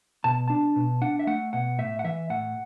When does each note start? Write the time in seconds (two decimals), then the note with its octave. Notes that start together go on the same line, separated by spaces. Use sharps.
0.24 B2 A5
0.48 D4 A5
0.76 B2
1.02 D4 F#5
1.19 E5
1.27 A3 F#5
1.53 B2 F#5
1.79 A2 E5
1.99 F#5
2.04 E3 E5
2.30 A2 F#5